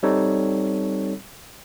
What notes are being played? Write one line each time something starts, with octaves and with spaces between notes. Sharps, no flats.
G3 C4 D#4 A4 C#5